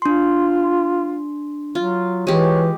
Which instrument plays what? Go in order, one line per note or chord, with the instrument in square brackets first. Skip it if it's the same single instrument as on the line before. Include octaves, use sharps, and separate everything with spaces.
[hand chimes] D4 C6 [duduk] F4
[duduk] F#3 [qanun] F4
[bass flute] E3 [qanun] G#3 G4 [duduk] C#5